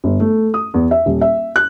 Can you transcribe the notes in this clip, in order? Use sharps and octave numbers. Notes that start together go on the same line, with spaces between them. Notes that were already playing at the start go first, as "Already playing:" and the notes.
G1
A3
D#6
E2
E5
D#1
E5
F#6